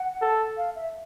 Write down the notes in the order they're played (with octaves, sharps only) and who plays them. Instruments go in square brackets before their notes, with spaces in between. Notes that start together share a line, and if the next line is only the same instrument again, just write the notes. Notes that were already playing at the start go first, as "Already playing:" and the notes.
Already playing: [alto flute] F#5
[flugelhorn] A4
[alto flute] F5
E5